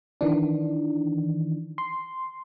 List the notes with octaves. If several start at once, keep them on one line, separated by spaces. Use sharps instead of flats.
D#3 E3 D4
C6